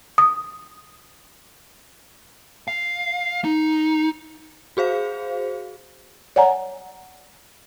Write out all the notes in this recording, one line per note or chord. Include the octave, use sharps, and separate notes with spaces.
D#6
F5
D#4
F#4 G#4 C5 F5
C#5 D5 F#5 G#5 A#5